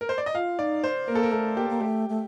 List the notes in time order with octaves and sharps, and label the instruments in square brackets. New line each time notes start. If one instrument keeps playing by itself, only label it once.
[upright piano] A#4
C5
D5
D#5
[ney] F4 [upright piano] F5
[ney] D#4 [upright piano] D5
[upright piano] C5
[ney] A#3 [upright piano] A#4
[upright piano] A4
A#4
[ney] A3 [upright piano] A4
[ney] A#3 [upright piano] G4
[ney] A#3
[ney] A3 [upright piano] G4
[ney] A3